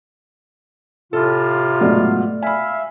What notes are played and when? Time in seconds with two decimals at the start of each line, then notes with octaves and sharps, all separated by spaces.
1.13 A2 C3 F4 A4
1.81 G#2 B2 F#3 A3 D5
2.43 E5 F5 G#5 B5